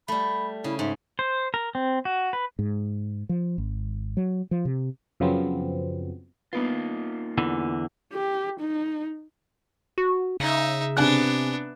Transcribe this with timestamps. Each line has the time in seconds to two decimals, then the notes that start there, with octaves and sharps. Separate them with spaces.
0.08 G3 A3 B5
0.64 C#3 E4
0.79 G#2 E5
1.19 C5
1.54 A#4
1.75 C4
2.05 F#4
2.33 B4
2.59 G#2
3.29 F3
3.58 G#1
4.17 F#3
4.51 F3
4.65 C3
5.20 F#2 C#3 F3 F#3 B3 C4
6.53 A#3 B3 D4 D#4 F4 B4
7.38 E2 D3 E3
8.13 G4
8.60 D#4
9.98 F#4
10.40 C#3 D#4 E5
10.97 C3 B3 D4 G#5 F#6